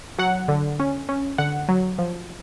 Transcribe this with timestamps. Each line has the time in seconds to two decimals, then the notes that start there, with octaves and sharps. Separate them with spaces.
0.18 F#3 F#5
0.48 D3
0.80 C#4
1.09 C#4
1.38 D3 F#5
1.69 F#3
1.99 F3